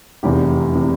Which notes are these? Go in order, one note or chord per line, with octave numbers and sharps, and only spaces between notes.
F1 E2 C3 E3 G4
C3 E3